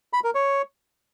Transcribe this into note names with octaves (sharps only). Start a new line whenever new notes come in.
B5
A#4
C#5